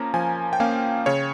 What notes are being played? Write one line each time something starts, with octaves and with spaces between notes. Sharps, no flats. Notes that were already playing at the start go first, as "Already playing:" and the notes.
Already playing: F3 A#3 C#4 A#5
F3 G#5
G5
A#3 C#4 F5
C#3 C#5